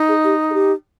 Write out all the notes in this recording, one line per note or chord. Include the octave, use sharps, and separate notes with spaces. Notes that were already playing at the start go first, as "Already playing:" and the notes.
Already playing: D#4
G#4
G4
G#4
G4